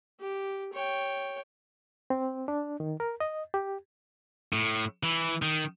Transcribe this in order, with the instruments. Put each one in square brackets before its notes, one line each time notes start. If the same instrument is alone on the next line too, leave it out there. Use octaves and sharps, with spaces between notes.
[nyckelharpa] G4
C#5 G5
[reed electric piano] C4
D4
D#3
A#4
D#5
G4
[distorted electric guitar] A2
E3
D#3